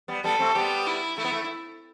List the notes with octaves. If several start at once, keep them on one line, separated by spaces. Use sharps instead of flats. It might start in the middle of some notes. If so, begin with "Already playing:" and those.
G3 B3
G3 B3 A4
A3 C4
G3 B3 G4
E4
A3 E4
B3
A3